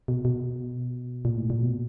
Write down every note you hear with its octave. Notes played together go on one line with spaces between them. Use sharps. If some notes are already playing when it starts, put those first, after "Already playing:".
B2
B2
A#2
A2
A#2
B2